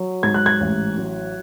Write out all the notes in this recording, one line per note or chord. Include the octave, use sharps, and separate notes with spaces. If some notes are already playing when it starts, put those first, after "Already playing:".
Already playing: F#3
G#2 G#6
F#6
G#6
A1
F#3